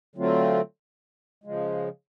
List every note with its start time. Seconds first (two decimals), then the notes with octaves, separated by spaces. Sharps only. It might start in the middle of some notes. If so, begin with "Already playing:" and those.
0.15 D3 F#3 A3 C4 F4
1.44 C#3 F3 G#3